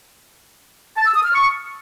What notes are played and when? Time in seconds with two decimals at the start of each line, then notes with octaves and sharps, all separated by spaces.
0.96 A5
1.05 E6
1.15 D#6
1.24 F6
1.33 C#6